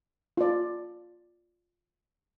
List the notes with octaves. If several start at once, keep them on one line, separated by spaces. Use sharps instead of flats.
F4 D5